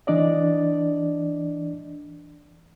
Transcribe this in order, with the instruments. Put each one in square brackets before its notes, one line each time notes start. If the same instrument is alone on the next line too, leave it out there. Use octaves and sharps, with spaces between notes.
[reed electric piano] E3 D4 D5 D#5